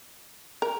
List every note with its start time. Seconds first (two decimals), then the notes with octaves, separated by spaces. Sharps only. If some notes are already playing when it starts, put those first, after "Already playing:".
0.62 A#4